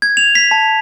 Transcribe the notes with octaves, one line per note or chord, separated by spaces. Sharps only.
G#6
F7
B6
A5